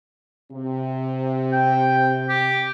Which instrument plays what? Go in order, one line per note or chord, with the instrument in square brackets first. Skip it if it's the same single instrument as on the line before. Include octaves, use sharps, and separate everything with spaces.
[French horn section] C3
[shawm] G5
G4